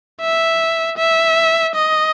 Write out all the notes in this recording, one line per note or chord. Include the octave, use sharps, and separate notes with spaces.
E5
E5
D#5